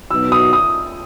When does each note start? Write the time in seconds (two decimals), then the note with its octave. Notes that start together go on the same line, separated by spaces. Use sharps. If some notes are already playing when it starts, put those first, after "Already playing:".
0.11 B2 F#3 B3 D#4 F#4 E6
0.32 D#6
0.53 D#6